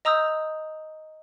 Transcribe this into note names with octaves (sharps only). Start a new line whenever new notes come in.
D#5 A#5 D#6 E6 G6